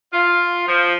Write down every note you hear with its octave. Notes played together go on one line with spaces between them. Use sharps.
F4
F3